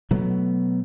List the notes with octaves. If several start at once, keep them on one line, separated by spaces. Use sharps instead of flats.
B2 F#3 A3 B3